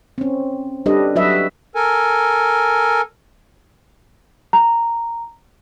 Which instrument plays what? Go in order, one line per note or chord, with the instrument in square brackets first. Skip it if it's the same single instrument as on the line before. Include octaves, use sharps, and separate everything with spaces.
[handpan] C4 C#4
G3 D4 G4 A4 B4 D#5
F#3 F#4 B4 D#5 E5
[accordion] A4 A#4 G#5
[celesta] A#5